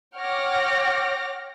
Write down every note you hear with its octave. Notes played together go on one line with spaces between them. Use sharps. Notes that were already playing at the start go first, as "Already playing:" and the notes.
C#5 F#5 G5 D6 F6 A#6